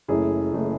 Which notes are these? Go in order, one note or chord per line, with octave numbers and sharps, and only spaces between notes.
F#1 F#2 E3 A3 E4 G#4
F#1 E3 A3